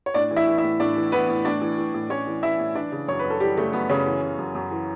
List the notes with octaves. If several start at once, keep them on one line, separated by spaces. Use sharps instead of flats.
C#5
A2 D4 D5
E3
E4 E5
E3
E4 E5
A2
A2 D4 D5
E3
E3 B3 B4
A2
A2 D4 D5
E3
E3
A2
A2 C#4 C#5
E3
E3 E4 E5
A2
E3 D4 D5
C#3
F#2 C#5
F#2 B4
A4
E3 G3 G4
C#3 A3
F#2 B3
F#2 C#3 C#4
E3
C#3
F#2
F#2
E3